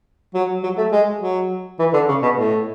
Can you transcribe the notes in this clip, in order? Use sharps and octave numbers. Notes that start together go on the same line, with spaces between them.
F#3
F#3
A3
G#3
F#3
E3
D3
C#3
B2
A2